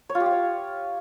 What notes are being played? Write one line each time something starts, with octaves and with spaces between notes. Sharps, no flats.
C#5
F4
G4
F4
C#5